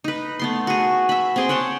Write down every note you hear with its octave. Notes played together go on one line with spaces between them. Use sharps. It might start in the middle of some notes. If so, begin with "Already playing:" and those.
D#4 B4
A3 B3 C6
F#4 G#4
E5 B5
C4 G#4 C6
C#5 F#5 G5 A5